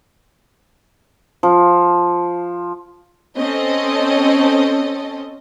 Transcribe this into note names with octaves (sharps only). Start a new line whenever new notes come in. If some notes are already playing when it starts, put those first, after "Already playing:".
F3
C4 C#4 A4 D#5